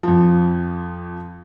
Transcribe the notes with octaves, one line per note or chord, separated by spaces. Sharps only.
F2 F3